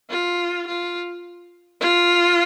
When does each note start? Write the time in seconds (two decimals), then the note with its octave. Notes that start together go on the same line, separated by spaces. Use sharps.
0.10 F4
0.67 F4
1.81 F4